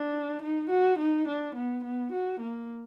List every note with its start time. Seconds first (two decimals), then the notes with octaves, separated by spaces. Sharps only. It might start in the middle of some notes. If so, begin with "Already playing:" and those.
Already playing: D4
0.42 D#4
0.70 F#4
0.98 D#4
1.28 D4
1.55 B3
1.84 B3
2.12 F#4
2.40 A#3